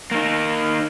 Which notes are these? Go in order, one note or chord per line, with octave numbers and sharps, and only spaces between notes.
A#3 D#4